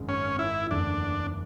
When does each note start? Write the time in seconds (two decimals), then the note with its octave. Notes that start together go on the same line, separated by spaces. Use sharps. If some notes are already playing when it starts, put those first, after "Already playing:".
Already playing: G#1 F#2 C#3 G#3
0.09 C#4
0.39 E4
0.71 F#1 E2 D3 A3 D4